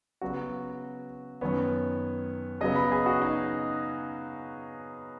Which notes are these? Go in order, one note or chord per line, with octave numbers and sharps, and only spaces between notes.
C#3 F#3 B3 F#4
F#2 D#3 B3 C#5
C#3 F#3 B3 D#5
B5
G#4
F#4
D#4